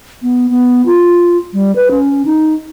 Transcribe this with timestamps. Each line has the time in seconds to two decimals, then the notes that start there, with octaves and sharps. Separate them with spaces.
0.22 B3
0.50 B3
0.86 F4
1.53 G3
1.76 B4
1.91 C#4
2.25 D#4